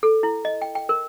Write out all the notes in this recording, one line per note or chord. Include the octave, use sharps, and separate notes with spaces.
A4
E4
D#5
G5
G5
A#4